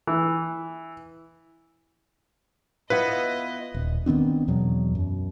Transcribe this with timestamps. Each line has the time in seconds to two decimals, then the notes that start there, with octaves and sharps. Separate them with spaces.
0.07 E3
2.90 B3 E4 F4 B4 D#5
3.74 D#1
4.06 D#3 B3 C4 D4
4.48 E2 B2 F#3
4.95 F#2